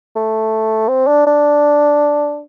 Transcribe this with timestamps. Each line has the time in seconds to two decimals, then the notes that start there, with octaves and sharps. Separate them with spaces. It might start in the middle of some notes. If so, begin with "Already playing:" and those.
0.16 A3
0.89 C4
1.07 D4
1.27 D4